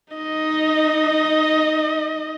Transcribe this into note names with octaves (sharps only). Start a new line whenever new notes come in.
D#4 D#5